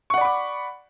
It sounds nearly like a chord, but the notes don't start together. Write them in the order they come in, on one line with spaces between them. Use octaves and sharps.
C#6 F#5 D5 B5 D6